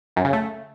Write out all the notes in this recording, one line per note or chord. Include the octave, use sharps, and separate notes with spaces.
F#2
C#3
A3